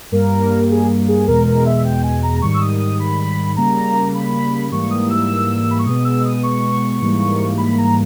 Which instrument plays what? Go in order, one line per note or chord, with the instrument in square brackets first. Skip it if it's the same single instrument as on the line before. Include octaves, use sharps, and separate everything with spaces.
[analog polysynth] G2 G3 A#3 A#4
G#4
G#4
E2 B2 G#3 A#4
A#4
E5
G5
G#5
A#5
G#2 D#3 G3 C#6
E6
D#6
D#6
B5
C#3 G3 A#3 A#5
B5
G#2 E3 G3 A#3 C#6
D#6
E6
B5
C#6
B2 G#3 B3 D#6
E6
D#6
C#6
G#2 E3 G3 A#3
B5
A#5